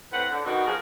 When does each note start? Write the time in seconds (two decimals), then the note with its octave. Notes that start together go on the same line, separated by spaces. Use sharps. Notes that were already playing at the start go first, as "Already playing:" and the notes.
0.12 A2 C4 B4 F#5
0.31 D3
0.45 B2 D#3 B3 D4 D#4 F#4
0.67 F3 G#4 A#4